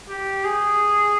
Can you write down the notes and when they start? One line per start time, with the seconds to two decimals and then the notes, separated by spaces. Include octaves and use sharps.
0.09 G4
0.45 G#4